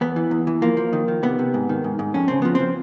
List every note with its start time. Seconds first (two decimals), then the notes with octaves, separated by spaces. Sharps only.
0.01 E2 B3
0.16 E3
0.31 E2
0.47 E3
0.62 F3 A#3
0.77 F3
0.93 D#3
1.08 D#3
1.23 C3 B3
1.39 C3
1.54 G#2
1.69 D#3
1.84 G#2
1.99 G#2
2.14 F2 C#4
2.28 C#3 C4
2.42 F3 B3
2.55 F3 C4